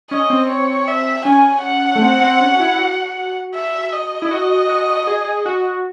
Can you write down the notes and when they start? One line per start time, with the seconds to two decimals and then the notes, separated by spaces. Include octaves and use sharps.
0.11 C#4 D#5
0.30 C4
0.50 C#5
0.88 E5
1.25 C#4 G#5
1.64 F#5
1.96 A3
2.02 C4
2.21 C4
2.40 C#4
2.54 F#4
2.60 E4
2.73 E4
2.78 F#4
3.55 E5
3.93 D#5
4.22 E4
4.31 F#4
4.69 F#4
5.07 G#4
5.25 G#4
5.46 F#4